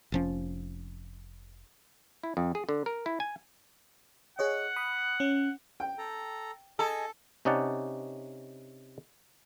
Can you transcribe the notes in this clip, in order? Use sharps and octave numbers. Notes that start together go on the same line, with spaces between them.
F1 F3 C#4
E4
F2
G#4
D3
A#4
E4
G#5
G#4 C#5 D#5 F#5
B5 D#6
C#4
G5
A4 A#5
G#4 A4 D#5 G#5 A5
C3 C#4 D#4 D5 F#5 A5